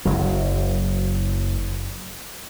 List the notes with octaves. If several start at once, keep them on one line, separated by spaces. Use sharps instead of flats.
F#1 F#3